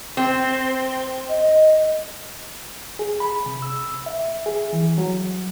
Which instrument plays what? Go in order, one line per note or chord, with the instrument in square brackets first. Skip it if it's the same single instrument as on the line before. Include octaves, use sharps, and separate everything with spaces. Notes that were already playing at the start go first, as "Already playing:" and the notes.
[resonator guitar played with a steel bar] C4
[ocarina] D#5
[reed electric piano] G#4
B5
C3
E6
E5
G#4
E3
F#3